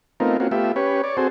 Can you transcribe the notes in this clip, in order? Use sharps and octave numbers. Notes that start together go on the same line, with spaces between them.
A3 B3 C4 D#4 F4 A#4
A#3 C4 C#4 F4 F#4
A3 B3 F4 G4 E5
C#4 G4 B4 C#5
C#5 D5
C4 F#4 G#4 A4 C5